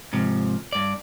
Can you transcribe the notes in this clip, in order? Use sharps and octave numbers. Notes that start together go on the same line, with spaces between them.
G#2 C3 F3
G2 D5